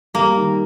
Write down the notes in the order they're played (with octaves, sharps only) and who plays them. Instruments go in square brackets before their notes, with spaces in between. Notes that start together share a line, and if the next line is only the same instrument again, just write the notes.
[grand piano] G3 [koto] A#3
[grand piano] D#3